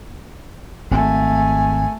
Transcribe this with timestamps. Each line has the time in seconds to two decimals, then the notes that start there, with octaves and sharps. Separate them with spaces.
0.91 G#1 A3 C4 G#5